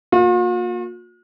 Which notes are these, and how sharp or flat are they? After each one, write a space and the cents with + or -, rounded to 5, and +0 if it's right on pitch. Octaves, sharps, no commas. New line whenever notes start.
A#3 +0 F4 +45